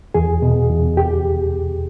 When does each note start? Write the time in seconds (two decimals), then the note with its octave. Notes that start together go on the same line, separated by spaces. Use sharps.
0.14 E2 G#4
0.42 B2
0.70 E2
0.97 G4